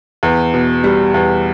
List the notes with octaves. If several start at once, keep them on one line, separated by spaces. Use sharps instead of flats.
E2
B2
G3
E2